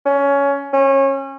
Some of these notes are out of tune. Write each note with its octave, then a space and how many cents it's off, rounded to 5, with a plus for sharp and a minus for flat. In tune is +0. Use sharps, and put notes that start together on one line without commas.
C#4 +15
C#4 -25